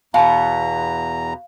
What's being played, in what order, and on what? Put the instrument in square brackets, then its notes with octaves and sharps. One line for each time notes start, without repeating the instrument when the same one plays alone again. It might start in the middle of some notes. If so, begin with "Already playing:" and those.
[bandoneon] E2 A#5 [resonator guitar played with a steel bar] B2 B3 [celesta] F5